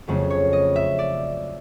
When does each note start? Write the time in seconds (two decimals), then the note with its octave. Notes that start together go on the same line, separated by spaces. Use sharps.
0.07 F2 C#3 F#3 A3
0.30 C#5
0.53 D#5
0.76 E5
0.99 D5